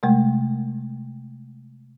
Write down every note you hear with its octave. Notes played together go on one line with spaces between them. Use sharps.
C3 G#3 A3